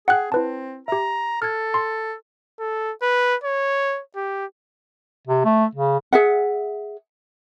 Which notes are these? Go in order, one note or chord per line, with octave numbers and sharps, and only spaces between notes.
G#4 F#5 G5 F#6
C4 E4 B4 A5
G4 E5 A#5
A4 F6 G#6
C6
A4
B4
C#5
G4
C3
A3
C#3
G#4 E5 F#5